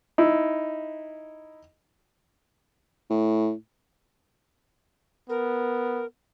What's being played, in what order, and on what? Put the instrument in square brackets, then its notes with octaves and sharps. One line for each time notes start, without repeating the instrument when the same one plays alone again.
[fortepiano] D#4 E4
[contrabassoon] A2
[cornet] B3 [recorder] A#4